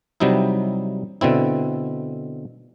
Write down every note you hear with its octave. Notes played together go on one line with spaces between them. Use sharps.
C3 F#3 G3 D#4 E4
B2 D3 C4 E4